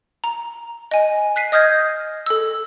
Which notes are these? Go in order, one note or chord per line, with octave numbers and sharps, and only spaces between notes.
A#5
D#5 G#5
F#6 B6 C7 D#7
D#5 D#6 F6 G6 G#6 A#6
A4 E6